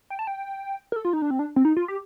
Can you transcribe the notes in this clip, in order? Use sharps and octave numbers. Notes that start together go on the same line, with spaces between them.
G5
A5
G5
A#4
A4
F4
D#4
D4
C4
D4
C4
D#4
F4
G4